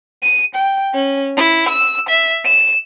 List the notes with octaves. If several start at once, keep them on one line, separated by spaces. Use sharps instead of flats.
D#7
G5
C#4
E4
E6
E5
E7